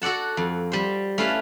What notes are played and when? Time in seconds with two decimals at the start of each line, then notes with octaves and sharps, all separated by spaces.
0.02 F#4 A4 D5 F#5 A5
0.37 F2
0.72 G3 C5
1.18 A3 C#4 E4 B4 F5 A5